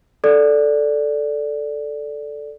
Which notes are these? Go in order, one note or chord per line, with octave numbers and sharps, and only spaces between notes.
A4 D5